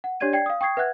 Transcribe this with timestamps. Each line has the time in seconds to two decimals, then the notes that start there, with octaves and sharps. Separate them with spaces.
0.04 F#5
0.20 D4 G4 C#5 D5 G#6 D#7
0.33 D5 G5 G#6 C7
0.46 F5 D#6
0.61 G5 C#6 D#6 G#6 C7
0.77 B4 E5 F#5 F#6 G#6